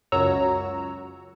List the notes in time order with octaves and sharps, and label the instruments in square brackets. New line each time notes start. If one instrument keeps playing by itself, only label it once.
[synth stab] C#2 F#2 F#4 C#5 A#5 E6